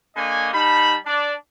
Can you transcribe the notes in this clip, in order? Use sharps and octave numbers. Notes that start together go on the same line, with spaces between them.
D3 A#3 C#5 D#5 G#5
G3 D#4 A5 B5
D4 D5